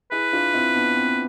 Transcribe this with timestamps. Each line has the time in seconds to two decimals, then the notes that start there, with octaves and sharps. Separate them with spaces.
0.12 E4 G#4 B4
0.32 D4 F4
0.54 C4 E4
0.75 B3 D4
0.96 C4